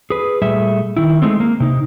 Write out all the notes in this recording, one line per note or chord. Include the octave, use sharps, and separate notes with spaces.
G#4 B4
A#2 G3 A3 G#4 E5
D#3 E4
G#3 A3 C4
A#3
C3 D#4